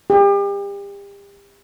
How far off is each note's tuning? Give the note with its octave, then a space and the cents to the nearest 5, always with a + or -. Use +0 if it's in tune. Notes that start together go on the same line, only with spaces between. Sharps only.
G4 +35